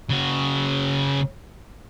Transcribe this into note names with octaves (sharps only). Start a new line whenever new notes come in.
C#3 F#4